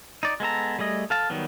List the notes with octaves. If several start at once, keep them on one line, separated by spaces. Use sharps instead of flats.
D#4 D5
G#3 B3 A4 A#5
G3 A3 G#4 D#5
A4 F5 A5
D#3 F#3 G3 B3